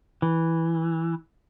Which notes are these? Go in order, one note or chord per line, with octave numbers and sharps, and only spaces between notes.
E3